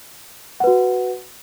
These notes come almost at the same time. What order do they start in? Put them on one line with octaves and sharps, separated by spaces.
F#5 B4 F#4